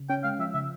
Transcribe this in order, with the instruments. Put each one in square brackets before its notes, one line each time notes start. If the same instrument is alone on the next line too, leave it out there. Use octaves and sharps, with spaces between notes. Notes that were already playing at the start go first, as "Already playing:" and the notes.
Already playing: [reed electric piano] C#3
[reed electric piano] C#4 [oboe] G5
[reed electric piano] G#3 [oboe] F5
[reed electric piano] F3 [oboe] E5
[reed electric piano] C#3 [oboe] E5